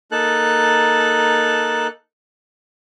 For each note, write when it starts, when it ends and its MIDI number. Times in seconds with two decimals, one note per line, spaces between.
0.12 1.87 58
0.12 1.87 63
0.12 1.87 69
0.12 1.87 81
0.12 1.87 90